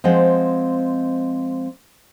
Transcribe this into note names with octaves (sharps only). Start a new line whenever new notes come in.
F3 G#3 C4 F#5